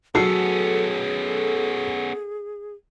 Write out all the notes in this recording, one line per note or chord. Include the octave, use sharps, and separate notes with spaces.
F#3 B3 C#4 G#4 A4 E6 C7